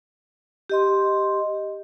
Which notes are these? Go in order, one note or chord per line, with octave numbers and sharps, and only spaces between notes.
G4 D#5 C6